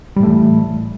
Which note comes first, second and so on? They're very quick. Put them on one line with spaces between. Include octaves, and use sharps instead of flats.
G3 A2 A3 E3